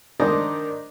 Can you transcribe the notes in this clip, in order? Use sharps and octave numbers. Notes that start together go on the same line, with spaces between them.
D#3 D4 C5 D5 D#5